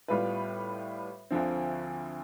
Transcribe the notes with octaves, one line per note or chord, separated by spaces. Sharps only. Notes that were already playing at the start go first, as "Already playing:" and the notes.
A2 G3 B3 F4 B4
D2 D3 F3 C4